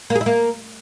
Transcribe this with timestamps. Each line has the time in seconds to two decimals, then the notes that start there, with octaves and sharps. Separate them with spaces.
0.10 A#3
0.15 G#4
0.21 E4
0.26 A#3